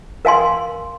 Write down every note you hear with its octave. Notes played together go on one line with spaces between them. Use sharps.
A#4 F5 G#5 C6